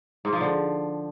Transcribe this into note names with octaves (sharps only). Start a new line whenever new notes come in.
G#2
F3
D3